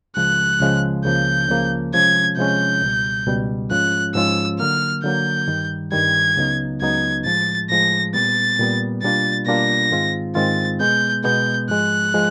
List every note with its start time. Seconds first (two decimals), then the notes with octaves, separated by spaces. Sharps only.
0.16 C#2 C#3 F3 G#3 F#6
0.60 C#2 C#3 F3 G#3
1.04 C#2 C#3 F3 A#3 G6
1.49 C#2 C#3 F3 A#3
1.94 C3 F3 G#3 C#4 G#6
2.37 C3 F3 G#3 C#4 G6
2.82 C#2 B2 G3
3.26 C#2 B2 G3
3.71 G#2 F3 G#3 C#4 F4 F#6
4.15 G#2 F3 G#3 C#4 F4 E6
4.59 D3 F#3 A#3 F6
5.04 D3 F#3 A#3 G6
5.47 G2 D#3 G3
5.92 G2 D#3 G3 G#6
6.37 C#2 C#3 F#3 B3 D#4
6.81 C#2 C#3 F#3 B3 D#4 G#6
7.25 A2 F3 G#3 A6
7.70 A2 F3 G#3 A#6
8.14 A#2 G3 B3 A6
8.59 A#2 G3 B3
9.02 B2 G3 A#3 D4 F4 A6
9.47 B2 G3 A#3 D4 F4 A#6
9.91 G#2 D#3 G#3 C4 F4
10.35 G#2 D#3 G#3 C4 F4 A6
10.80 B2 G#3 B3 G6
11.24 B2 G#3 B3 G6
11.69 G#2 F3 G#3 F#6
12.14 F3 G#3